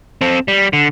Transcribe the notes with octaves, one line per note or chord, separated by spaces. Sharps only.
C4 A4
G3
D3